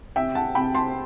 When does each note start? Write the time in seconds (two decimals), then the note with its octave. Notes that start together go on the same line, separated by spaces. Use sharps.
0.16 C3 E5 G5
0.35 F#5 A5
0.55 C3 G5 B5
0.75 A5 C6